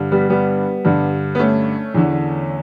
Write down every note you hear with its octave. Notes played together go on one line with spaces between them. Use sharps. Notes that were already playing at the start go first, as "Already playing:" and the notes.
Already playing: G2 D3
G3 B3
G3 B3
G2 D3
B3
A3 C#4
E2 D3